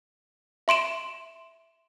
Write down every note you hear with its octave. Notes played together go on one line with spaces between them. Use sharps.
E5 C6 D7 E7